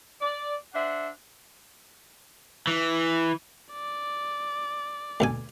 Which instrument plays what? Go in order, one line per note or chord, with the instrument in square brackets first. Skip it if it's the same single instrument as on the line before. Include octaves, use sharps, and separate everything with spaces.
[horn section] D5
D4 C5 E5 F#5
[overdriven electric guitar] E3
[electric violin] D5
[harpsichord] D2 B2 G#5